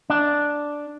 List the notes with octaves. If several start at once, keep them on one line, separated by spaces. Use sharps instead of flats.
D4